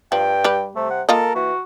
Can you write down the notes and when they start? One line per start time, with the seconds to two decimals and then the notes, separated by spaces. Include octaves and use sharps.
0.12 G2 F3 G5
0.44 G3 G4 B4
0.76 C3 A3
0.90 F#5
1.09 A#3 F4 A4 A#4 D#5
1.35 E3 F#4